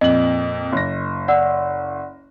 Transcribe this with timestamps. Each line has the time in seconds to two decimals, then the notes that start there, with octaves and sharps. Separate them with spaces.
0.01 F2 A#2 D#5 F#7
0.72 F#1 A#6
1.28 D5 F#5 E6